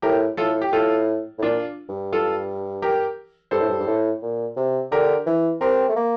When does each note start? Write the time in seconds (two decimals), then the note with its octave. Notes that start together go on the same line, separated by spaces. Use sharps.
0.02 A2 G4 A#4
0.37 A2 F4 A4
0.62 G4
0.72 A2 F4 A4
1.38 A2
1.42 A#2 D4 F4
1.89 G2
2.13 F4 A4
2.82 G4 A#4
3.51 G2 A4 C5
3.60 A2
3.69 G2
3.80 G2
3.86 A2
4.22 A#2
4.56 C3
4.91 D3 G4 A#4
5.26 E3
5.61 C4 G4 A#4
5.89 A3
5.96 A#3